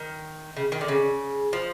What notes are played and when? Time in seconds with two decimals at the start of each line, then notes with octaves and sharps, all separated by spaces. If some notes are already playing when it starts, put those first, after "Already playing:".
Already playing: D#3
0.56 C#3
0.72 D#3
0.81 D3
0.88 C#3
1.53 F3